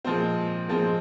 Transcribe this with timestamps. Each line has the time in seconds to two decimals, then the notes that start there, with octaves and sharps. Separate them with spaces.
0.05 A#2 F3 G#3 C4
0.68 A#2 F3 G#3 C4